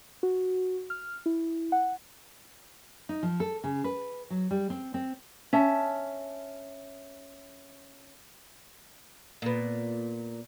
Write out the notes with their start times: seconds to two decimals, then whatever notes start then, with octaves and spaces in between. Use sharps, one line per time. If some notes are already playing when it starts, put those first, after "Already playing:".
0.23 F#4
0.90 F6
1.26 E4
1.72 F#5
3.09 D#4
3.23 F3
3.40 A4
3.64 C#3
3.84 B4
4.30 F#3
4.51 G3
4.70 C4
4.94 C4
5.53 C#4 E5 A5
9.42 A#2 B3